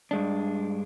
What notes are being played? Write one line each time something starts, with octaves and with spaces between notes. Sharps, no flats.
G2 G#3 D4